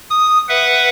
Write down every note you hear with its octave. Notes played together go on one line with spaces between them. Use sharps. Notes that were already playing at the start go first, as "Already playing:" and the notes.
D#6
B4 E5 F#5